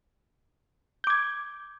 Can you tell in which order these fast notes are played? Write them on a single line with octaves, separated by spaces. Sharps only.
G6 D6 G#6